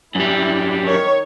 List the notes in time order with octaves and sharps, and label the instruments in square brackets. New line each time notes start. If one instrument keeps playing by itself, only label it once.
[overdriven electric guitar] F#2 G3 [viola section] E4
[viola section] D#3 C#5